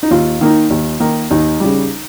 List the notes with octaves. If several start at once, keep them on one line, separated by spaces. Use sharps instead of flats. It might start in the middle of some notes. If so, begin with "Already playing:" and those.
D#4
D#2 F4
D#3 A#3 D#4
D#2
D#3 A#3 D#4
D#2 D#4
C#3 G3